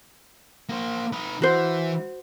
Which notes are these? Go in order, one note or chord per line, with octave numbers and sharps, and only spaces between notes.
A#3 C5
D#4 B4
E3 F#4 C5